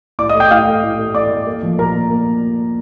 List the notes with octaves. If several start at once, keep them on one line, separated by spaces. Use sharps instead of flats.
A2 D5 D6
D#5 D#6
A3
G5 G6
A2 F5 F6
A3
A2
A3
A2 D5 D6
A3
A#3
F3
A#2 A#4 A#5
A#2
A#3